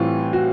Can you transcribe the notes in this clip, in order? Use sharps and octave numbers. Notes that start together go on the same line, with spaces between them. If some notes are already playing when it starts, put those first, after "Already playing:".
Already playing: A2 E3 G3 C4 F4
F#4